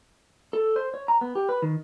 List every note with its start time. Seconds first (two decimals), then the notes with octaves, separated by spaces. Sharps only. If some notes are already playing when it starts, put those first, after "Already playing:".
0.53 A4
0.76 C5
0.94 C#5
1.08 A#5
1.21 B3
1.35 G4
1.49 B4
1.62 D#3